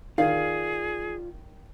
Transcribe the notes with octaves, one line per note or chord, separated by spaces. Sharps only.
D#3 F4 G#4 D5 F5